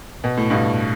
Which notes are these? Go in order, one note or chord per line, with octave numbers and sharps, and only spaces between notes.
B2
A2
G2 B2